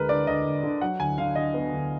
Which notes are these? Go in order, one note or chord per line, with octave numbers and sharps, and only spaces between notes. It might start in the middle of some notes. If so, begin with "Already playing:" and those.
Already playing: D2 G#3 A#4 B4
D3 D5
D2 D#5
D2
D3
F#3 F#5
D2 G#5
D3 F5
D3 D#5
B3
D2